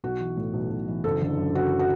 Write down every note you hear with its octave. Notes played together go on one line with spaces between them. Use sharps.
B1 F#4
E3
A2
B1
B1
E3
F#1 A4
D3
F#2
F#1 F#4
F#4